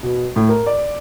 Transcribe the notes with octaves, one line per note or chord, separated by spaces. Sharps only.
B2
A2
A#4
D5